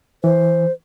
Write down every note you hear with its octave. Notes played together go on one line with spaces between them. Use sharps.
E3 C5